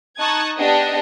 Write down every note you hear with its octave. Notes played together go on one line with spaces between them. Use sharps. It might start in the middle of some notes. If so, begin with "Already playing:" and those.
D#4 A5 C#6 D#6 F#6 G#6
B3 D4 G4 D#5 F#5 G5